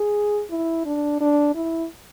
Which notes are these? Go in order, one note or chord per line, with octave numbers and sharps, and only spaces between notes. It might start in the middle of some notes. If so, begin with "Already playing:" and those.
Already playing: G#4
E4
D4
D4
E4